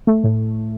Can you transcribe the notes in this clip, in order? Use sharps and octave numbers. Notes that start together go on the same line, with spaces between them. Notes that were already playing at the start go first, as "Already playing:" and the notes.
A3
A2